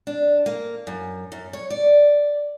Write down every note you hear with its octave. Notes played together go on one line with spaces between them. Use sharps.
D4
A#3
F#2
F#2
C#5
D5